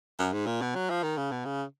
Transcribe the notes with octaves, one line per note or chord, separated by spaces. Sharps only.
F#2
G#2
A#2
B2
F#3
F3
D#3
C#3
B2
C#3